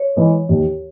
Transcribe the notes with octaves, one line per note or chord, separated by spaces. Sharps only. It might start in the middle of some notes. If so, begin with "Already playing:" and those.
Already playing: C#5
E3 G#3
D#2